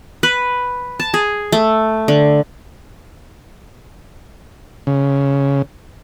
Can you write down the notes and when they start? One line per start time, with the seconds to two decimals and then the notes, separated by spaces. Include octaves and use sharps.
0.23 B4
1.00 A5
1.14 G#4
1.52 A3
2.08 D3
4.87 C#3